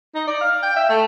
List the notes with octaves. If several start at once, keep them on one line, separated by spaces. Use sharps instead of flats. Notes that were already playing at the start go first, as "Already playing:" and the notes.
D#4
D5
F5
G5
E5
A3